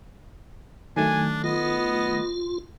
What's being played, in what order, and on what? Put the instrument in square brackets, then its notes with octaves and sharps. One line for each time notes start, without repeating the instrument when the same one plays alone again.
[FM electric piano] D#3 F#3 A3 [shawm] D4 [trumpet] G#5
[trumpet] B3 [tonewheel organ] F4 [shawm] D#5